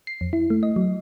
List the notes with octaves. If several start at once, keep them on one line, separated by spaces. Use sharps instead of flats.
C7
F2
E4
A3
D#5
F#3